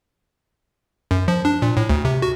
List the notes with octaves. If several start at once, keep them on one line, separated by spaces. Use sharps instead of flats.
F#2
F3
D4
A#2
A2
D2
C3
F#4